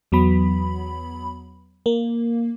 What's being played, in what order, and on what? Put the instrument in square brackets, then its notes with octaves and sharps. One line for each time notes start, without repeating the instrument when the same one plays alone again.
[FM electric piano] E2 F#3 B3 B5
A#3